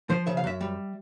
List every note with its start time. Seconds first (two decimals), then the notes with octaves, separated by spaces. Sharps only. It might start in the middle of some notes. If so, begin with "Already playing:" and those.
0.10 F3 C5
0.27 C#3 E5
0.37 F5
0.44 F#2 E5
0.61 G3